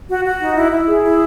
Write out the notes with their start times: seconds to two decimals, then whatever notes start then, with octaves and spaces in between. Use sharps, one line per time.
0.09 F#4
0.25 F#4
0.40 D#4
0.55 E4
0.72 E4
0.88 G#4
1.04 E4